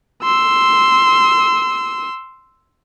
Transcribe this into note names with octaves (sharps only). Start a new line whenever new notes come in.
C6 E6